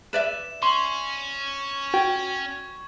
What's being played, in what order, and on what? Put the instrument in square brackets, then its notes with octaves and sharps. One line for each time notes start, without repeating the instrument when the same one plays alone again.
[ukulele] B4 D5 E5 [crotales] E7
[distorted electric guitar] C#4 [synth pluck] C6 [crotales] C#6 F#7
[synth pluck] F#4 G5 [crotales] G#6